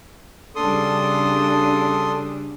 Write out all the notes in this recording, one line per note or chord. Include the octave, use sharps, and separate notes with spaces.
C#3 G3 D4 A4 C6 D#6